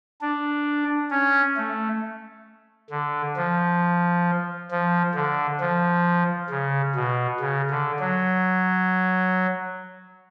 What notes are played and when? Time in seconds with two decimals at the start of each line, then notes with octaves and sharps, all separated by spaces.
0.21 D4
1.11 C#4
1.56 A3
2.90 D3
3.36 F3
4.71 F3
5.15 D3
5.60 F3
6.50 C#3
6.95 B2
7.40 C#3
7.71 D3
8.00 F#3